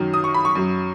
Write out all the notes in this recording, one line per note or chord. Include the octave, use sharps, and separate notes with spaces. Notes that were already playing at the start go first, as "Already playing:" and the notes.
Already playing: F#2 D#3 F#3
D#6
C#6
B5
C#6
F#2 F#3